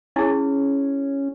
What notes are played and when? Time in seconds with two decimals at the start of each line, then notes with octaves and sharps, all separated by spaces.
0.16 C#4 E4 G#4